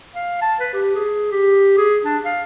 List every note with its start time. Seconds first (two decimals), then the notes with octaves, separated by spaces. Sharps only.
0.14 F5
0.41 A5
0.60 B4
0.73 G4
0.95 G#4
1.31 G4
1.77 G#4
2.05 D4
2.25 F5